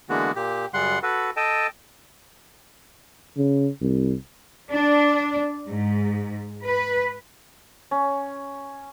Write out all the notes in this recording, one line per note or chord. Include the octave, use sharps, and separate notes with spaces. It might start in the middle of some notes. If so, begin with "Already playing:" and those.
D3 E3 G#3 A#3 B3 F#4
A#2 G4
F#2 C#3 G3 F#5 C6
F#4 A4 B4
A4 D#5 G5 A5
C#3
C2
D4
G#2
B4
C#4